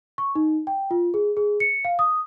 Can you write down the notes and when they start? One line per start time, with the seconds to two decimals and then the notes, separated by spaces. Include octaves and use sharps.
0.18 C#6
0.35 D#4
0.67 G5
0.91 F4
1.14 G#4
1.37 G#4
1.60 C#7
1.85 F5
1.99 D#6